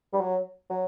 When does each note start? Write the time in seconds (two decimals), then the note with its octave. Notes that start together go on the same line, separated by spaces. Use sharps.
0.13 G3
0.20 F#3
0.70 F#3